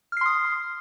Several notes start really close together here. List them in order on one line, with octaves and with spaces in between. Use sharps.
F6 C7 C6 D#6